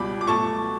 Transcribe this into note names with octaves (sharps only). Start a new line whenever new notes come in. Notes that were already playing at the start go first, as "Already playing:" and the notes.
Already playing: C#2 B2 G3 B5 D6
D6
B2 F#3 A3 A5 C#6